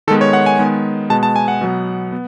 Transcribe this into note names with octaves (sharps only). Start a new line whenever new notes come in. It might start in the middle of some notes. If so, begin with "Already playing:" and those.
D#3 G#3 B3 A4
C#5
F#5
G#5
D#3 G#3 B3
B2 G#3 B3 A5
A5
G#5
F#5
B2 F#3 B3
B3